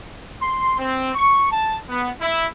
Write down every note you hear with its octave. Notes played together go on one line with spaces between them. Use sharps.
C6
C4
C#6
A5
B3
E4